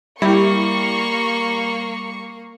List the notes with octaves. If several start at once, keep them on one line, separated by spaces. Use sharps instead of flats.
G3 A#3 E4 G4 C#6